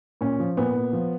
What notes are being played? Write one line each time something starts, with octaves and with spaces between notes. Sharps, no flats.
A#2 C#4
F3
A#2 B3
A#2
F3